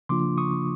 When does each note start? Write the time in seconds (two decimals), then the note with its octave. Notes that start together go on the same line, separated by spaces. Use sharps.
0.09 C#3 F3 A#3 D4 F4 C6 D6
0.38 C#6 D#6